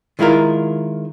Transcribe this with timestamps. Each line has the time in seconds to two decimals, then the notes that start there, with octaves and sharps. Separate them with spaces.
0.19 D#3 G#3 E4 F4 A#4